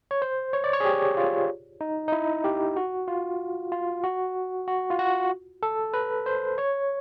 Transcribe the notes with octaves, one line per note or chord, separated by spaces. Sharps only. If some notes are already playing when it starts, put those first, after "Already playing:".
C#5
C5
C#5
D5
C#5
G#4
G4
F4
D#4
D#4
E4
G4
F#4
F4
F4
F#4
F#4
F4
F#4
A4
B4
C5
C#5